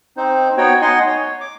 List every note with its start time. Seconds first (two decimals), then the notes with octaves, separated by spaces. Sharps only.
0.17 C4 D#4 C5
0.57 B3 D#4 F#4 C#5 G5
0.82 D#4 D#5 F#5 G#5 C6
1.06 C#5
1.41 D6